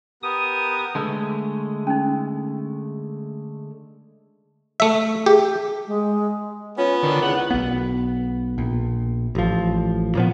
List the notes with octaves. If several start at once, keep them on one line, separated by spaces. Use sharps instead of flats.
B3 G4 A#4 D#6
D3 G#3 A3
C#4 D#4
A3 E5
G4 G#4
G#3
B3 C#4 F4
D3 D#3
C#2 E4 F#5
B1 B3
A#1
A1 F3
A#2 F3 B3